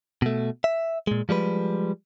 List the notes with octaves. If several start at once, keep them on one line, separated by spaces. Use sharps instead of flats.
B2 A3
E5
A#2 G#3
F3 G3 G#3 B4